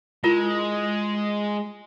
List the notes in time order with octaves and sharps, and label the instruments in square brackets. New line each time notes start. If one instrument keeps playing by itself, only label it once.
[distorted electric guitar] G#3 [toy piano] E4 F4 A#4